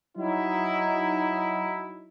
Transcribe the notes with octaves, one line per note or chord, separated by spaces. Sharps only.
F#3 D#4 E4